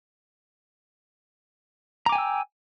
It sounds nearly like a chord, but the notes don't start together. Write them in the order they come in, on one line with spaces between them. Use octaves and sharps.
A#5 D6 G#5 G5 E6